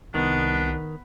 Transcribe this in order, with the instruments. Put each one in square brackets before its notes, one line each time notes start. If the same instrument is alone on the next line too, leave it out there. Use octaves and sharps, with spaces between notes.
[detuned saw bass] C2 [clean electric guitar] D#3 [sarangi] B3 [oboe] D4